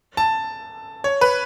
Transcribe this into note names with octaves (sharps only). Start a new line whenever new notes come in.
A5
C#5
B4